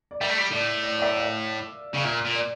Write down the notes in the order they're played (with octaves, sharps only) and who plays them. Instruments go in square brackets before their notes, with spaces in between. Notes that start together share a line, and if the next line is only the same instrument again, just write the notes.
[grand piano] D5
[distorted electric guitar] G3 [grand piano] E5
[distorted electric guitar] A3
G3
[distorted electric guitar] A2 [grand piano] D5
[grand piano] D5
D5
E5
F5
E5
[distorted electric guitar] C#3 [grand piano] F5
[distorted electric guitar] A#2 [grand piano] E5
[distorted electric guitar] A#2
[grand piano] D5